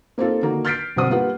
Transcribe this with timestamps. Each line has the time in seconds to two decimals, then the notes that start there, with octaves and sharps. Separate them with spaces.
0.18 A#3 C4 D#4 F4 A4
0.42 D3 D#3 A#3 D#4 F#4
0.65 F6 G6 A6 B6 C7 D7
0.96 G1 B2 D3 C4 F#5 D#6
1.10 G3 A#3 B3 F4 B4 F#5